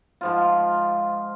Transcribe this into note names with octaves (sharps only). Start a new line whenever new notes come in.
G#2 F3 F4